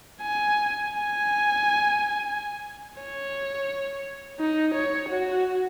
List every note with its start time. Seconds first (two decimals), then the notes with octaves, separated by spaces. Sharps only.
0.22 G#5
0.92 G#5
3.00 C#5
4.40 D#4
4.74 C#5
5.09 F#4